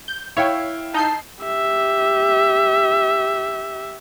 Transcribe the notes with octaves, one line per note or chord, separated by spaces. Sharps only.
G6
E4 C#5 F5 G5
D#4 A5 G6 C7
G4 E5